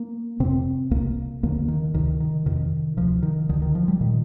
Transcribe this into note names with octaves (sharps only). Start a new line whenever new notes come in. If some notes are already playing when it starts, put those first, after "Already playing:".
Already playing: A#3
F2 C3 C4
C2 C3 A#3
D#2 D3 A#3
D#3
D2 C3 D#3
D#3
F2 C3 D#3
D2 C3 F3
D#3
D2 D3 D#3
D#3
F3
G3
A#2 D#3